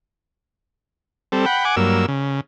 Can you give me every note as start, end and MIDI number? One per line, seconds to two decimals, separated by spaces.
1.32 1.46 55
1.32 1.46 60
1.32 1.46 69
1.46 1.65 78
1.46 1.65 79
1.46 1.65 83
1.65 1.76 78
1.65 1.76 80
1.65 1.76 86
1.76 2.06 43
1.76 2.06 54
1.76 2.06 58
1.76 2.06 88
2.08 2.40 49